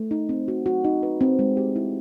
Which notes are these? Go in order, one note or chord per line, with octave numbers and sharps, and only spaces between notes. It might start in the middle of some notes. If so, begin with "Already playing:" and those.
Already playing: A3
D#4
C4
F#4
F#4
D#4
B4
C4
G#3
G4
E4